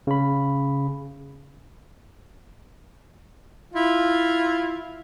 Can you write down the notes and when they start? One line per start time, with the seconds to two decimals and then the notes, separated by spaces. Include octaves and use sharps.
0.07 C#3 B5
3.74 E4 F4